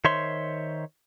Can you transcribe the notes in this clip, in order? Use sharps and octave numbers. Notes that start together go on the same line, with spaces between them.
D#3 C5 C#5 E5 C6